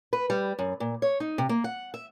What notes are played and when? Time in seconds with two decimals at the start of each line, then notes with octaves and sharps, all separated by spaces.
0.13 B4
0.30 G3
0.59 F#2
0.80 A#2
1.02 C#5
1.20 D#4
1.38 C3
1.49 A#3
1.64 F#5
1.94 E5